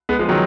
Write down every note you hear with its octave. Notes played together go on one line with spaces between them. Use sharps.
G#3 B3
F3 G#3
D#3 F#3